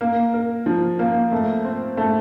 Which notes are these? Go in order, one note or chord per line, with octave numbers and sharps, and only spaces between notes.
A#3
A#4
F3
A#3
A3
C4
A3